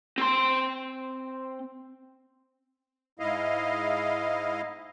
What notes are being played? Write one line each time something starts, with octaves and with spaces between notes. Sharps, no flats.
C4 C6
G#2 E4 D#5 F5